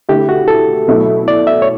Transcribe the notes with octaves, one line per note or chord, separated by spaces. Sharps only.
D3 A3 E4 G4
F#4
A4
B2 F#3 A3 E4
D5
E5
C#5